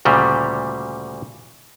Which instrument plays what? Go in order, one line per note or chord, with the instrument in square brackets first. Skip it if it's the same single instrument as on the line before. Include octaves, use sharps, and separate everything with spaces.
[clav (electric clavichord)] D2 A#2 C#3 G3